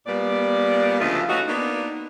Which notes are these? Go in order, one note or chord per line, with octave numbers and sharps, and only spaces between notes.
A#2 G3 A#3 B3 D5
D2 C#3 F3 A3 F4 D#5
E3 A3 C#4 D#4 F#4
A#3 B3 D4 D#4